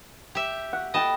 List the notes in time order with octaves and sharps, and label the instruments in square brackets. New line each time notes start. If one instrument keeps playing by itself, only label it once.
[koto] G4 E5
[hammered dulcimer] F#5
[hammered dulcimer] A4 G5 B5 [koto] D#5 A5